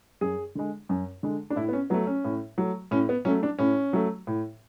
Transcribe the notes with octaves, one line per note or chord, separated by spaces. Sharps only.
F#2 G#4
D3 G#3
F#2
D3 G#3
D4
A2 E4
B3
C#4
F#3 A3 B3
C#4
A2
F#3 A3
A2 C#4
B3
F#3 A3 C#4
D4
A2 C#4
F#3 A3
A2